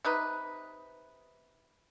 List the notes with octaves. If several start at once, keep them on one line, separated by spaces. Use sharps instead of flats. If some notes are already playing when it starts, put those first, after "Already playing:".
C3 D#4 B4